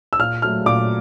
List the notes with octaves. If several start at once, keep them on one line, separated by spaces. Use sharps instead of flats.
E6
A#2 F6
F#3 A3 F6
A#2 D6